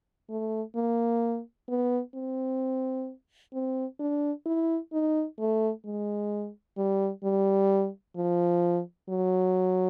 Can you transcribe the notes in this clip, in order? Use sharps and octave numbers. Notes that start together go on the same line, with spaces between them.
A3
A#3
B3
C4
C4
D4
E4
D#4
A3
G#3
G3
G3
F3
F#3